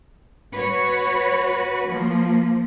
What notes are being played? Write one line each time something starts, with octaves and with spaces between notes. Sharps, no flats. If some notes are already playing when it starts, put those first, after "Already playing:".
F#4 B4 C#5
F3 A#3